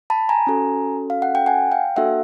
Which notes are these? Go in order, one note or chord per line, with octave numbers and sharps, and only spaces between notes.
A5 B5
G#5 A#5
C#4 F#4 A4
F5
F#5
G5
F#5 G#5
F5 G5
A#3 D4 F#4 A4 E5 F#5